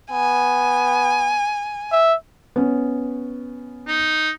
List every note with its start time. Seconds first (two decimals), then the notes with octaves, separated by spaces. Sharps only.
0.11 B3 G#5
1.92 E5
2.56 B3 C#4
3.87 D#4